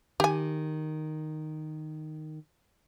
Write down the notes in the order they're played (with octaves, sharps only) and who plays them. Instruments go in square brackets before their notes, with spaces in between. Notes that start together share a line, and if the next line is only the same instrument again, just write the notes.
[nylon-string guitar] D#3 [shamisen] G4 G#5